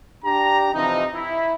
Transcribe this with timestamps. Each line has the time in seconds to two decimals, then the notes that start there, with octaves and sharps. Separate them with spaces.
0.25 D4 G4 A#5
0.74 C3 E3 F3 C4 D#4
1.14 E4